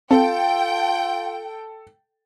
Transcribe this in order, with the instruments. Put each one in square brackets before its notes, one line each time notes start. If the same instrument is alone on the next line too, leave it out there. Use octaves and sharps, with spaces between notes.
[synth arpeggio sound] C4 [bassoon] F4 [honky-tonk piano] A4 [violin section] G5